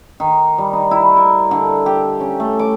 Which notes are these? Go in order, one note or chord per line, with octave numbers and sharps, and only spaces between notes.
D#3
G3
D#4
E4
A#4
D3
G4
C#4
A3
D6